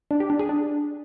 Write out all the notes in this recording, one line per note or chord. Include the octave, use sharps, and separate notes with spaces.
D4
G4
D4
G#4
D4